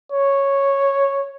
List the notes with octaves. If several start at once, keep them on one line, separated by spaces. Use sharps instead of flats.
C#5